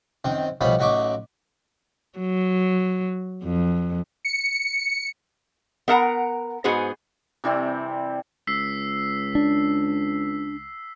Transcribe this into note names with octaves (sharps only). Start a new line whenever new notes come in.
F#2 D#3 C4
B1 F3 G3 D#4 C#5 B5
A1 F#3 D#4 E5 C#6 D6
F#3
F2
C#7
B3 A#4 F#5 A5 A#5
G#2 B3 F#4 G#4 C5
C3 E3 G3 C4
C#2 E6 B6 C7
D4